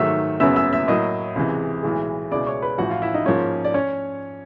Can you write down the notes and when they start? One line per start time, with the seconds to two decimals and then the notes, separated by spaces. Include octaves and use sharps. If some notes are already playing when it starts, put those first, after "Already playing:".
Already playing: G#2 D#3 F#3 A3 E5 E6
0.40 F#1 F#2 C#3 F#3 B3 E5 E6
0.56 E5 E6
0.73 E5 E6
0.87 A2 F#3 A#3 D#5 D#6
1.36 C#2 C3 E3 G#3
1.83 B1 A2 E3 G#3
2.31 C#2 B2 G#3 B3 E4 D5 D6
2.47 C#5 C#6
2.62 B4 B5
2.78 A1 A2 F3 F#4 F#5
2.90 F4 F5
3.02 E4 E5
3.14 D#4 D#5
3.26 G#2 F3 A#3 C#4 C#5
3.64 D5
3.74 C#4 C#5